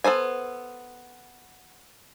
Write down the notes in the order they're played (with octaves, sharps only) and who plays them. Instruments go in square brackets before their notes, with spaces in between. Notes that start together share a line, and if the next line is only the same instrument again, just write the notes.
[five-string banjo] B3 A4 C5 G#5